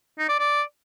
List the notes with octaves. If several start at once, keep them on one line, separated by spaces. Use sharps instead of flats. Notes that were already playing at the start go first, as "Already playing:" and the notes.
D#4
D5
D5